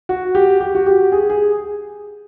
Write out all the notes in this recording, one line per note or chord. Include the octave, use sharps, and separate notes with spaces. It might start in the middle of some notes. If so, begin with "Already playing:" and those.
F#4
G4
G4
F#4
G4
G#4
G#4